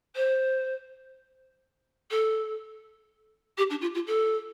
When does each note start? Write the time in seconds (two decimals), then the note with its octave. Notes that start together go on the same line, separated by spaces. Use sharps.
0.15 C5
2.10 A4
3.57 G4
3.70 D4
3.81 F4
3.94 F4
4.07 A4